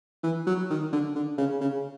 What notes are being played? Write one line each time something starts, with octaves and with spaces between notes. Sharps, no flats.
E3
F#3
D#3
D3
D3
C#3
C#3